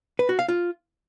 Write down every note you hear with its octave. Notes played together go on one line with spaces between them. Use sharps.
B4
F#4
F5
F4